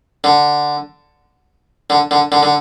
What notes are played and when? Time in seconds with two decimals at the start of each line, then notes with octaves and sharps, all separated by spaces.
0.24 D3
1.90 D3
2.11 D3
2.32 D3
2.43 D3